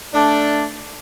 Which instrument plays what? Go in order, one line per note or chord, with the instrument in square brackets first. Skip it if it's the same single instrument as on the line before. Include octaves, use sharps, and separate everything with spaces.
[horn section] A3 D4